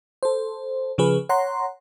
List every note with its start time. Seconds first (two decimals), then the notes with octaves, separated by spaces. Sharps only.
0.23 A4 C5
0.98 C#3 F3 G#4 B4
1.29 C#5 F#5 A#5 C6